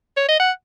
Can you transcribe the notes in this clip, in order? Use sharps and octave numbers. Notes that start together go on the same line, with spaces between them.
C#5
D#5
F#5